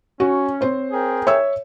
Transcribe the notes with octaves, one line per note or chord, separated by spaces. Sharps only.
C#4 F#4
C4 C5 C#5
G#4 A#4 G5
C#5 E5 E6